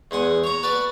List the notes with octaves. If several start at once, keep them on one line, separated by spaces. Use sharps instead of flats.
E2 G#3 F#5 G#5
C#5 A#5
F#4 B4 D5 A5